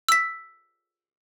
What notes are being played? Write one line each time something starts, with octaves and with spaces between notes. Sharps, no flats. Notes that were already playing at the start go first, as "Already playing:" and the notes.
E6 B6